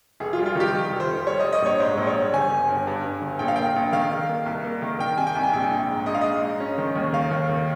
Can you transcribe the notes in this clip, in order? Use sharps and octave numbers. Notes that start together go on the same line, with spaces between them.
F1 G#4
F4
G3
F4
D#3 G4
D#3
F1
C5
F1
G3 C#5
D#5
G3
D#5
A#1 C#5
G#2 C5
A#1
C#5
G3
G1 G#5
G1
G2
G2
G2
G1
A#1 G5
F5
A#3 G5
A#1
D#3 F5
D#3
A#3
C2
A#3
D#3
D#3 G5
C3 G#5
G5
C2
G#5
A#1 G5
A#1
G#2
A#1 D#5
F5
G#2 D#5
G#2
C#4
D#3
D#2
D#3 F5
D#2
D#3